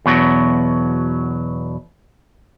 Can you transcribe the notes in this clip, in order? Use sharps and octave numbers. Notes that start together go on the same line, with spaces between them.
E2 B2 F#3